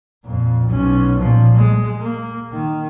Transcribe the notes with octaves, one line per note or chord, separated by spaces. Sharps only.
F2 A#2
B1 C#4
A#2 F3
G#3
A#3
D#3